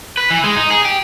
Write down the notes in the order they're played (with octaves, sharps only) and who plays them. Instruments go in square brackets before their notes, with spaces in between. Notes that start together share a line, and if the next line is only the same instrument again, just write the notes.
[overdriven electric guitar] B4
E3
G#3
D#4
G#4
G4